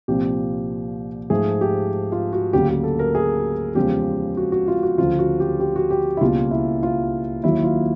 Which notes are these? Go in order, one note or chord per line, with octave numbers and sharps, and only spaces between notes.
C2 A#2 F3 G4
G#2 F3 A3 G#4
G4
F4
F#4
D2 C#3 F#3 A#3 G4
G4
A4
A#4
G#4
E2 C#3 F3 G#3 G4
F#4
F#4
F4
F#4
D2 C#3 F3 F4
F#4
G4
G4
F#4
G4
E4
C#2 B2 G3 A#3 F4
E4
F4
D#2 D#3 F#3 A#3 E4
F4